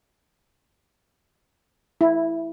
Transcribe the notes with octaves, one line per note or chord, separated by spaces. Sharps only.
E4